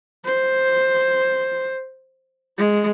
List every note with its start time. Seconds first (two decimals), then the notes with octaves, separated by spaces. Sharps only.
0.25 C5
2.58 G#3